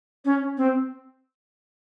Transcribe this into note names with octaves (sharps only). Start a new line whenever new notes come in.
C#4
C4